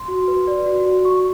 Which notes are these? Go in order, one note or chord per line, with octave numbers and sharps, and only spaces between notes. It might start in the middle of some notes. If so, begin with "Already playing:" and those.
Already playing: C6
F#4
B4
D5
F#4
F#4
F#4 C#6